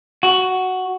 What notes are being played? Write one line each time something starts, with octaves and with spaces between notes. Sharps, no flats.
F#4